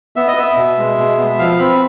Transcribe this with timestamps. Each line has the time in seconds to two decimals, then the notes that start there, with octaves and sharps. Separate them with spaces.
0.16 B3 E5
0.28 D#5
0.37 B3 E5
0.57 B2
0.78 G#3
0.98 B2
1.18 B3
1.39 F3 F5
1.59 C4 B5